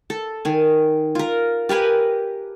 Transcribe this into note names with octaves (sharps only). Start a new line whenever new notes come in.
A4
D#3 G#5
F4 A#4
G4 A#4 B4 G#5